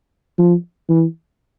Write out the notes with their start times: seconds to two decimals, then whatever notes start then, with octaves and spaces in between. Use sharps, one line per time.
0.39 F3
0.89 E3